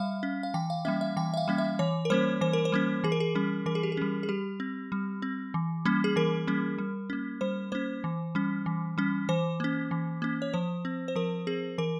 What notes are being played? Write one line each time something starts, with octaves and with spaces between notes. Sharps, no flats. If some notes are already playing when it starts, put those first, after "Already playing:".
Already playing: G3 E5 F5
C#4
F5
E3 G5
F5
G3 A#3 C#4 E5
E5
E3 G5
E5
F5
G3 A#3 C#4
E5
E3 C#5
A#4
G3 A#3 C#4 C5
E3 C5
A#4
C5
G3 A#3 C#4
E3 G#4
A#4
G#4
G3 C#4
E3 A#4
G#4
G4
G#4
G3 C#4
G#4
G3 G4
C4
G3
C4
E3
G3 A#3 C#4
G#4
E3 A#4
G3 A#3 C#4
G3
A#3 C#4
G3 C5
A#3 C#4 C5
E3
G3 C#4
E3
G3 C#4
E3 C5
A#3 C#4
E3
A#3 C#4
C#5
F3 C5
C4
C5
F3 A#4
C4 G#4
E3 A#4